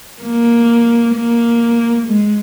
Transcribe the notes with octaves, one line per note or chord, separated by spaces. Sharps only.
A#3
A#3
G#3